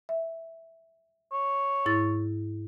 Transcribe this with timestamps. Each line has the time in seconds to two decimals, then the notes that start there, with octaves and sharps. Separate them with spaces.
0.09 E5
1.32 C#5
1.86 G#2 E4 A6